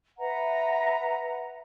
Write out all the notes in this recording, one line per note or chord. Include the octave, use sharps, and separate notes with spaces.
B4 E5 F#5 A#5